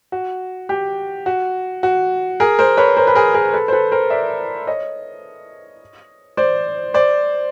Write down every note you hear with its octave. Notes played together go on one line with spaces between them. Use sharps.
F#4
G4
F#4
F#4
G#4 A#4
A#4 C5
B4 C#5
A#4 C5
B4
G#4 A#4
G#4 A#4
A4 B4
C5
A4 B4
A#4 C5
D5 E5
C#5 D#5
C5 D5
C5 D5